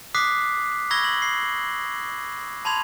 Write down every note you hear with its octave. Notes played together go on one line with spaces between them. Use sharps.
D6 D#6 F#6 B6 C7
B5 C#6 E6 G#6 A#6 G7
F#7
C7
A5 B5 C6 G#6 F7